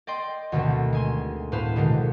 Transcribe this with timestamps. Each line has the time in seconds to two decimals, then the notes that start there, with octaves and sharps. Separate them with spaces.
0.07 D5 D#5 G5 C6
0.52 D2 B2 D3 D#3 A3 C4
0.93 G#3 G#5 C6
1.52 A2 B3 B4 C5 F5
1.76 B2 D3 D#3 G#3